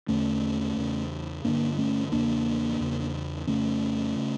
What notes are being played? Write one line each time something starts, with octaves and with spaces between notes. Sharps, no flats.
E2 D3 A3 C#4
E2 C#3
G2 D3 A#3 D4
A3 C#4
E2 C#3 A#3 D4
E2 C#3
F2 C#3 A3 C#4
C#3